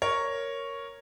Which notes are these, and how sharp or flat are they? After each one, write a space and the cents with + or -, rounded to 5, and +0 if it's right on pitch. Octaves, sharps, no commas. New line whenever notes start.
A#4 +0 C#5 +0